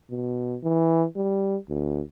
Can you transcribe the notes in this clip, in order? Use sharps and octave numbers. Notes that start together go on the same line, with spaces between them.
B2
E3
G3
D2